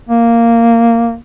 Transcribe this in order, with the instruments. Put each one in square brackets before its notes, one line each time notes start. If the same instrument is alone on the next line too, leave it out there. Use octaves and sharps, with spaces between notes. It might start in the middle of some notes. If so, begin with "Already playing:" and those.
[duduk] A#3